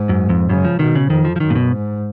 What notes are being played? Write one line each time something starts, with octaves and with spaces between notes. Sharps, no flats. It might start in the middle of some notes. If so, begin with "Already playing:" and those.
Already playing: G#2
F#2
F2
F#2 C#3
F3
B2 D#3
C#3
F2 D#3
F3
F3
F#2 D#3
A#2
B2
G#2